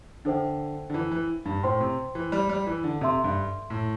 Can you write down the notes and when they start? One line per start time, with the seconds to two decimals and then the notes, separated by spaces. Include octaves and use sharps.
0.25 D3 D4 A4 C5 E5 G5
0.90 D3
0.94 E3
1.11 E3
1.45 G2
1.63 A2 C5 G5 C6
1.81 C3
2.15 E3
2.32 G3
2.49 G3
2.67 E3
2.84 D3
3.01 C3 A4 E5 C6
3.24 G2
3.70 A2